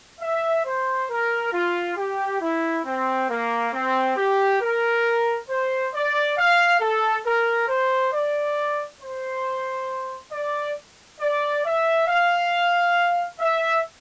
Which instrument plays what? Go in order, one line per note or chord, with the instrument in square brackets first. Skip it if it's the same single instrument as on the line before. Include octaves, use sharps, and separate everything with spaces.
[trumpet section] E5
C5
A#4
F4
G4
E4
C4
A#3
C4
G4
A#4
C5
D5
F5
A4
A#4
C5
D5
C5
D5
D5
E5
F5
E5